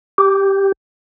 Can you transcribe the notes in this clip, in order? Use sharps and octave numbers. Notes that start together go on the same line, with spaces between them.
G4